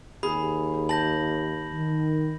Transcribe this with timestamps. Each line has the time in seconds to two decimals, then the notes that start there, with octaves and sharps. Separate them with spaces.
0.23 D#2 G#4 B5
0.89 A5 G6 A#6 F#7
1.73 D#3